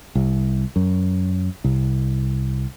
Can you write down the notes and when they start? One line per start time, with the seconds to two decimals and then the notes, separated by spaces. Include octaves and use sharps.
0.15 C2
0.76 F#2
1.64 C2